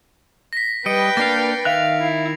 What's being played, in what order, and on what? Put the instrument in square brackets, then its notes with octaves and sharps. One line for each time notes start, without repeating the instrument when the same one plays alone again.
[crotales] A#6 B6
[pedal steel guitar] G3 D#5 [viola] B4 G5 [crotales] C#7 D7
[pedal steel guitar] A#3 D4 F5 [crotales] A6 C7
[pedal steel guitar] D#3 E5 F#6 [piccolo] F5 [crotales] F7
[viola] E4